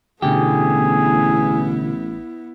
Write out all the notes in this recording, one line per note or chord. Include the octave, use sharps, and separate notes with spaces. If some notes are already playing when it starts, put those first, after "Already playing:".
A1 B2 D3 B3 E4 G4 G#4